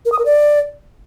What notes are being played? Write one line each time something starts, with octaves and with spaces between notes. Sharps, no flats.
A#4
D#6
A#4
D5